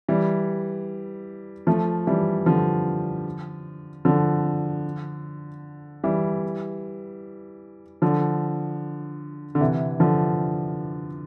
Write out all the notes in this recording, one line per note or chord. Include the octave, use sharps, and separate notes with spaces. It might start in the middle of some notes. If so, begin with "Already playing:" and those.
E3 G3
F3 A3
E3 G3
D3 F3
D3 F3
E3 G3
D3 F3
D3
C3 E3
D3 F3